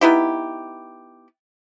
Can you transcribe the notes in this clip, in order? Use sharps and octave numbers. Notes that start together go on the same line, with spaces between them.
B3 D#4 E4 G4